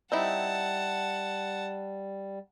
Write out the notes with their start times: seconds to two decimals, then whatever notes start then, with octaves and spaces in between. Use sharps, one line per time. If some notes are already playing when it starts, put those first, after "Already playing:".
0.12 G3 C4 D#4 E4 F#5 A5